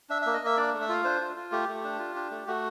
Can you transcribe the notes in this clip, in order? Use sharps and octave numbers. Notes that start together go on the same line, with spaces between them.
D4 E5
A#3 E5
D#5
A#3 E5
D4 D5
A3
E5
F4 F5
D4 C5
F4
F4
A3 G4
A3
D4
F4
D4
A3
A3 F#4